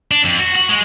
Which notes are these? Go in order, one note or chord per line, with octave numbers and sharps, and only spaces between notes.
D4
F2
F#4
F#4
G#3